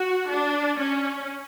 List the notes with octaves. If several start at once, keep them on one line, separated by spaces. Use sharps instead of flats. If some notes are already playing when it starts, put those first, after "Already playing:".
Already playing: F#4
D4
C#4